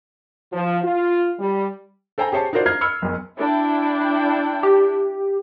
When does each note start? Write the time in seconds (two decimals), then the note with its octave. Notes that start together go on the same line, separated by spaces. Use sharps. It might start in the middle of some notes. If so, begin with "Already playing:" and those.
0.53 F3
0.83 F4
1.40 G3
2.18 A4 C5 G5 G#5 A#5
2.32 G4 G#4 C5 C#5 A5
2.53 D#4 F4 F#4 A#4 C5 D5
2.66 A#5 F6 G#6 C7
2.81 B5 E6 F6 C#7
3.02 F#1 B1
3.38 D4 E4 G5
4.63 G4